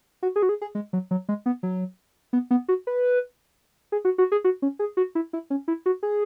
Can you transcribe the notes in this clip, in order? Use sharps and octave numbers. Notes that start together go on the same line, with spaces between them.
F#4
G#4
F#4
G#4
G#4
G#3
F#3
F#3
G#3
B3
F#3
B3
B3
F#4
B4
G#4
F#4
F#4
G#4
F#4
C#4
G#4
F#4
E4
E4
C#4
E4
F#4
G#4